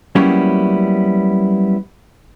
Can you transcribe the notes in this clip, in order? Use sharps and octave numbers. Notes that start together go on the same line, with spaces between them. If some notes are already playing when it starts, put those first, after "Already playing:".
F#3 G3 A#3 B3 C#4 E4